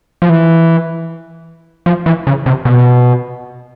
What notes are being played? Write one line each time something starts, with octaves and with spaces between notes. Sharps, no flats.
F3
E3
F3
E3
C#3
C3
B2